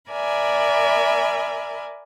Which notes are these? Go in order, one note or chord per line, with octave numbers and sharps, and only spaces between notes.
A#4 D5 E5 G#5 B5